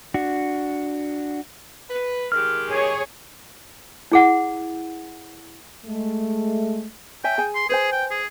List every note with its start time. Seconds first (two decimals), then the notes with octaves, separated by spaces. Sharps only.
0.14 D4 F#4
1.90 B4
2.32 D#3 G#3 G4 F6
2.70 G#4 C#5
4.12 E4 G#4 F#5
5.85 G#3 A3
7.24 C#5 E5 G5 G#5
7.38 G#4 G#5
7.55 C6
7.69 G#4 B4 C5 G#5
7.92 G5
8.11 G#4